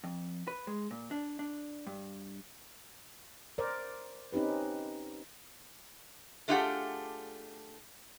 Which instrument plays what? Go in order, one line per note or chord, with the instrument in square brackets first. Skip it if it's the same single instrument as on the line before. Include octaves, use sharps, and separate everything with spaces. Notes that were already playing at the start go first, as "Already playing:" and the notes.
[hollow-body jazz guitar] F2
B4
G#3
A#2
D4
D4
G2
[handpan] A#4 C5 D5
C4 C#4 D#4 G4 B4
[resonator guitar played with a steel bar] A3 D4 F4 G4 G#4 F#5